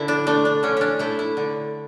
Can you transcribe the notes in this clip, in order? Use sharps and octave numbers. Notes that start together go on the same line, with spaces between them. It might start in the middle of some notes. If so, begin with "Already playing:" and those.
Already playing: D3 E4
D4
A3 D4
D4
D3 C#4
C#4 D4
A3 E4
E4
D3